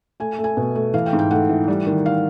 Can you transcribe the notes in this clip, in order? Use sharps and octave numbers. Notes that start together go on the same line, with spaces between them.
A3 G#5
A3
G#5
B2
A3
E3 F5
G5
G#2
G5
A3 F#5
E3
G3
D#3
F5